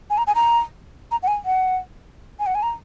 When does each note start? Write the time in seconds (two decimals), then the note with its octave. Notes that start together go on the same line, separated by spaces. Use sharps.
0.10 G#5
0.18 A#5
0.27 G#5
0.35 A#5
1.11 A#5
1.23 F#5
1.28 G#5
1.45 F#5
2.39 G#5
2.46 F#5
2.55 G#5
2.63 A#5